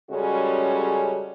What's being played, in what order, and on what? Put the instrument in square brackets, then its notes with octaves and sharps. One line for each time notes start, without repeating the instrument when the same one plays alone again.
[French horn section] C#3 G3 G#3 C#4 F#4 A4